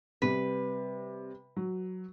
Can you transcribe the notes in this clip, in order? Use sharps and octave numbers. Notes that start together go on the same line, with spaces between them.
C3 G3 B4
F#3